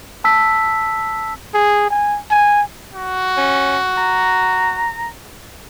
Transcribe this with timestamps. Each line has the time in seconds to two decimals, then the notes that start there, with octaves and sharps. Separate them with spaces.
0.24 A5 E6 B6
1.54 G#4
1.90 G#5
2.31 G#5
2.93 F#4
3.37 C#4
3.97 A#5